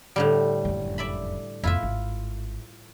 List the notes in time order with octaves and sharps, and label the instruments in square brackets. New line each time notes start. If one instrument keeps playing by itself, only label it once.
[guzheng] A2 D3 G3
[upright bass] F#1 F2
[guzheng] D5 E5 B5
[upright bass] F2 B3 [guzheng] E4 F4 E5
[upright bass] G#1